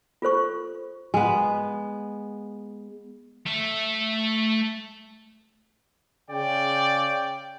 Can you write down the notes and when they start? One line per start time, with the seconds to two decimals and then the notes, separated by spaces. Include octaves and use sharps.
0.22 F4 A4 C5 C#6
1.14 G#3 B3
3.46 A3 E5
6.31 C#3 D5 G5